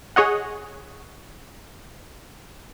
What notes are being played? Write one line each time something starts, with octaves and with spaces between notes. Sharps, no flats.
G#4 C#5 D#5 F#5